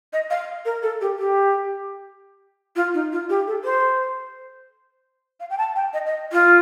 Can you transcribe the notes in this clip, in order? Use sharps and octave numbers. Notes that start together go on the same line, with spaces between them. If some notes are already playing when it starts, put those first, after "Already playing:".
D#5
F5
A#4
A4
G4
G4
F4
D#4
F4
G4
A4
C5
F5
G5
A5
G5
D#5
D#5
F4